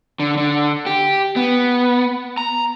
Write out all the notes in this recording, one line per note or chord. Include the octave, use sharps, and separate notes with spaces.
D3
D3
G4
B3
A#5